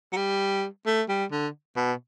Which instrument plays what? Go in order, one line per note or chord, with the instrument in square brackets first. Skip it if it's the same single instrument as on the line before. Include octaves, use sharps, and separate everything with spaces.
[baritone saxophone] F#3
G3
A3
G3
D3
B2